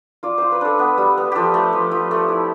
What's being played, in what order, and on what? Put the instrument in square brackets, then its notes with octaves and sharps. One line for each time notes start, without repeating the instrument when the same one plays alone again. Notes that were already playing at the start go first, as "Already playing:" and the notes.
[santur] F4 D5
F4 C5
B4
D4 A4
B3
G3
B3
F3 G4 A4
A3
F3
F3
A3
E4